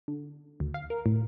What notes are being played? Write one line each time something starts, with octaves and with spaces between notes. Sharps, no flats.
D3
D2
F5
A#4
A2